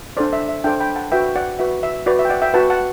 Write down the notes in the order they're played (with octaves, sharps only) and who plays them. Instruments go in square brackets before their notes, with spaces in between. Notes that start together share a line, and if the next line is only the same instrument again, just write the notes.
[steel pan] D4 A4 C5 D5
E5
E5
D4 A4 C5 E5 G5
G5 B5
F#5 A5
F#4 B4 E5 G5
D5 F#5
F#4 B4 E5
E5
F#4 B4 D5
E5
G5
D5 F#5
E5 G5
F#4 B4 F#5 A5
F#5 A5